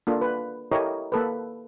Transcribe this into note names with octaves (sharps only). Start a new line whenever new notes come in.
A#3 D4 F4 A4
B4
E4 G4 A4 A#4 C#5 D#5
A#3 A4 B4